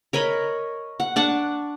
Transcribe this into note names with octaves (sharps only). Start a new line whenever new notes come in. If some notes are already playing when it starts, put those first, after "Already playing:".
A#4 C#5 D#5 B5
F#5
D4 F#5 A5 C#6